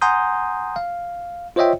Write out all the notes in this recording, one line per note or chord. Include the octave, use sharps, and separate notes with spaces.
F#5 G#5 A#5 C6 D#6 G6
F5
F4 C5 C#5 D#5 E5 G5